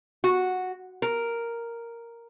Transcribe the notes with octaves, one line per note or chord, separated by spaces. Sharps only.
F#4
A#4